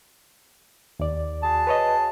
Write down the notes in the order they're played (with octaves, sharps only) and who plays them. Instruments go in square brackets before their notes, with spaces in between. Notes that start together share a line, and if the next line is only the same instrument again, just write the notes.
[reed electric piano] D#2 D5
[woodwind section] F#4 G#4 A5
[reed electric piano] B4 C#5 D#5